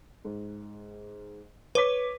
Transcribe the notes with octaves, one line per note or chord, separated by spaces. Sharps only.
G#2
B4 C#5 D6 B6